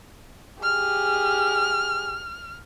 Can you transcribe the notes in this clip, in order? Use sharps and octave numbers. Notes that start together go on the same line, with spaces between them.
G4 G#4 F6